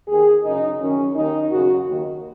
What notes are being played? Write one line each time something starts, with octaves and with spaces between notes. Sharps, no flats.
D#2 D#3 G#4
F#2 C#3 D#4
F#2 D#3 C#4
D#2 D#3 D#4
F#2 C#3 F#4
D#2 D#3